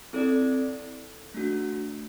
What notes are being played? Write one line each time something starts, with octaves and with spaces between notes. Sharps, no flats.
C4 E4 A4 D5
A3 D4 F#4